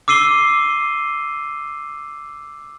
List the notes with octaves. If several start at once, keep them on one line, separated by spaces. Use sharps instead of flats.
D6 E6 C7 D#7 G7